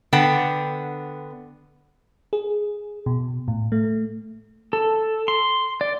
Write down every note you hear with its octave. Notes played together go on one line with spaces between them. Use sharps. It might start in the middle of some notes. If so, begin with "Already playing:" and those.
D3 B3 F#5 G5 A5
G#4
B2
A2
A3
A4
C6
D5